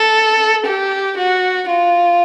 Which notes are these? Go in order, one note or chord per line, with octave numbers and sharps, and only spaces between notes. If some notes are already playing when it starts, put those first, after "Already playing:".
Already playing: A4
G4
F#4
F4